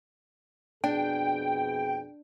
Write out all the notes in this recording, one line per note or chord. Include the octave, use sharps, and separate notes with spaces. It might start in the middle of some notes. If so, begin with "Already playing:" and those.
F2 B2 D4 G#4 G5